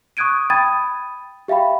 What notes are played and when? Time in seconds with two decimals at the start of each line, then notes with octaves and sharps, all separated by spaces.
0.17 C#6 D#6 F#6 G#6 D7 D#7
0.50 G5 B5 D#6 G#6 A6 D#7
1.48 G4 E5 F5 G5 B5